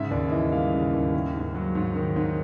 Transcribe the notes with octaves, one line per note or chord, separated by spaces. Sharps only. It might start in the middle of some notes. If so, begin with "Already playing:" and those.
Already playing: G#2 C#3 E5
D#2 D5
E3 D#5
G3 F5
C#3
D#2
D#3
G#2
F#3
G#2
D#3
G#2